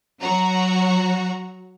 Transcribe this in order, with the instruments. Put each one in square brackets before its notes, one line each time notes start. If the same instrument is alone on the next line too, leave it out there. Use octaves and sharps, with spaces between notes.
[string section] F#3 F#4 A#5